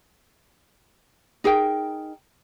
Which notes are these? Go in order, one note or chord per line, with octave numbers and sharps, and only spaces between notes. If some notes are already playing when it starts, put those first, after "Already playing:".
D#4 G#4 A#4 G5